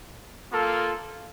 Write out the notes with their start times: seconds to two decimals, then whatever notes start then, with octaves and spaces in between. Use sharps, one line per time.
0.51 A#3 F4 A4